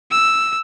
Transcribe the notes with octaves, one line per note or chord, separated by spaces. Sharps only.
E6